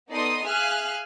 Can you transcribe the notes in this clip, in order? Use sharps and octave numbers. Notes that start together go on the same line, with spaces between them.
B3 D#4 A4 D5 C6 D#6
G#4 E5 F5 G#5 F6 F#6